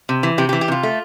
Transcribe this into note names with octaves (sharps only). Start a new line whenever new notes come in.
C3
E3
C3 G4
G4
E3
G4
C3 F4
A3